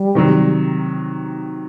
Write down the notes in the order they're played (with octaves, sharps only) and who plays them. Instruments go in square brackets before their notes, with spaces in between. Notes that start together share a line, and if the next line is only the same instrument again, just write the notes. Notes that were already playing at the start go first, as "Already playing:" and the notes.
Already playing: [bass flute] G3
[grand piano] C3 D#3 F#3